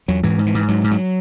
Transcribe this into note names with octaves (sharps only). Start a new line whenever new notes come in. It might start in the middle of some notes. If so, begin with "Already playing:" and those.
E2 F#3
G#2 E3
G#2
E3
G#2
G#2 F#3
G#2
F#3